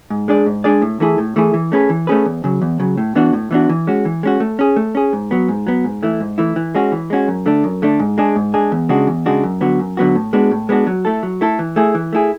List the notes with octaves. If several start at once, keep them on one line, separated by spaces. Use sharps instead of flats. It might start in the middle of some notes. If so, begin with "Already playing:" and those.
G#2
G#3 D4 G#4 D5
G#2
G#3 D4 G#4 D5
A2
E3 A3 E4 G#4
A2
E3 A3 E4 G#4
E3
A3 C#4 G#4 B4
E3
A3 C#4 G#4 B4
E2
C#3 F#3
E2
C#3 F#3
A2
E3 B3 D4 F#4
A2
E3 B3 D4 F#4
E3
G#3 C#4 F#4
E3
G#3 C#4 F#4
A3
C#4 G#4
A3
C#4 G#4
G#2
F#3 B3
G#2
F#3 B3
G#2
E3 A3 E4
G#2
E3 A3 E4
E3
G#3 C#4 F#4
E3
G#3 C#4 F#4
F#2
D3 A3 D4
F#2
D3 A3 D4
G#2
G#3 D4 G#4
G#2
G#3 D4 G#4
E2
C#3 G#3 D4 F#4
E2
C#3 G#3 D4 F#4
F#2
D3 F#3 B3 F#4
F#2
D3 F#3 B3 F#4
A2
G#3 B3 D4 F#4
A2
G#3 B3 D4 F#4
F#3
A3 E4 A4
F#3
A3 E4 A4
E3
A3 E4 G#4
E3
A3 E4 G#4